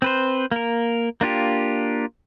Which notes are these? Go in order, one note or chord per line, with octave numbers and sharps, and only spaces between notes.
C4 B4 C5
A#3 A#4
A#3 D4 F4 G4